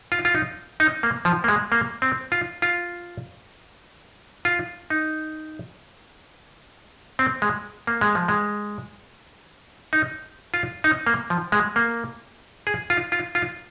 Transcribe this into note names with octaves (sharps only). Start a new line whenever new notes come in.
F4
F4
D#4
D#4
A#3
F3
A#3
G#3
A#3
C4
F4
F4
F4
D#4
C4
G#3
A#3
G#3
F3
G#3
D#4
F4
D#4
A#3
F3
G#3
A#3
G#4
F4
F4
F4